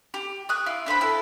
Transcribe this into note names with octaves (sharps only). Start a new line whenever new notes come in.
G4
C#6 D#6 F#6
E4 F4
D4 B4 C5 B5
E4 A4